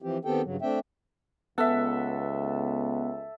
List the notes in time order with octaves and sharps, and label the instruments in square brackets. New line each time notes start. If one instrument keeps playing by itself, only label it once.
[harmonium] E3 F3 C4 G4
D#3 B3 C4 G4 A4 G5
G2 C#3 F#3
A3 C4 D4 E5 G5
[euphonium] C#2 [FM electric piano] B3 F#5 [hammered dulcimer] A4 E5